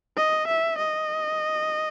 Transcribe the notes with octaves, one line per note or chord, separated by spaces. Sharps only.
D#5
E5
D#5